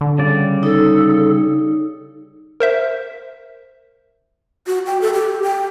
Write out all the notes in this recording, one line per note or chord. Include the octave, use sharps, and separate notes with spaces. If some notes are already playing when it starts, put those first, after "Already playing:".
D3
C#3 G3 D5
D#4 A4
A#4 C5 E5
F#4
G5
A4
G4
G5